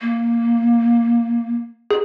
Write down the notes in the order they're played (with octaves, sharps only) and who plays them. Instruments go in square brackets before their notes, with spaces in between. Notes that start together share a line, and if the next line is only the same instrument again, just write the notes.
[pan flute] A#3
[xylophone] G#4